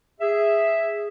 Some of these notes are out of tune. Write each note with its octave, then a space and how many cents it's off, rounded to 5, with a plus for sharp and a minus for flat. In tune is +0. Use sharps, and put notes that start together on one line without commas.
G#4 -10 E5 +0